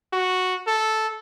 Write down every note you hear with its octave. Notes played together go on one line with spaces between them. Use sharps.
F#4
A4